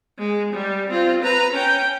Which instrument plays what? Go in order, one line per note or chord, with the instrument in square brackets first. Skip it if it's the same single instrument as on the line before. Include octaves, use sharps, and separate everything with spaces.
[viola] G#3
G3
C4 F4
B4 A#5
C#4 G5